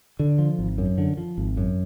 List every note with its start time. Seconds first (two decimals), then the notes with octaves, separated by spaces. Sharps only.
0.19 D3
0.39 F3
0.59 G#1
0.78 F#2
0.98 D3
1.17 F3
1.38 G#1
1.57 F#2